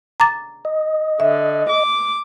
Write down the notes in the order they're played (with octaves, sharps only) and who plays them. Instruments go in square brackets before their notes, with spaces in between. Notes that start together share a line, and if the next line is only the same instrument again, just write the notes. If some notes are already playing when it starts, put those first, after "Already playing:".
[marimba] A#5 D6 A6
[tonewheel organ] D#5
[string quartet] D3 [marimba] E5
[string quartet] D6